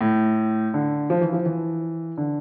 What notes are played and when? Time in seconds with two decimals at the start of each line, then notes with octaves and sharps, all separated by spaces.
0.01 A2
0.74 D3
1.10 F3
1.21 E3
1.33 F3
1.46 E3
2.17 D3